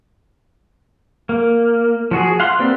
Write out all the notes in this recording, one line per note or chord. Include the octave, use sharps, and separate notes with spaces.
A#3
F3 F#4 G#4
F5 F#5 C6
A#3 C4 G4 B4 D5